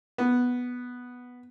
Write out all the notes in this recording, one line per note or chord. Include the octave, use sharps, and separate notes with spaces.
B3